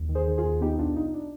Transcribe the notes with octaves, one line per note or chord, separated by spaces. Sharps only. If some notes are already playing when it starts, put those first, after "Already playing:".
Already playing: D#2
D#3
G#4 C5
D#3
F4 G#4
D#2
B3 D#4 G4
B1 D4 F4
B1 D#4
D4